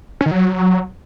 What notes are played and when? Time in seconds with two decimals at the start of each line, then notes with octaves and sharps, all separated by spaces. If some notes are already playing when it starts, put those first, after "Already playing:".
0.21 C#4
0.26 D#3
0.31 F#3